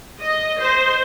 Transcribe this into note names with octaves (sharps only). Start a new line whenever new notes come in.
D#5
C5